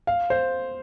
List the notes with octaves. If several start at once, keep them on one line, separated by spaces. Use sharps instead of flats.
F5
C5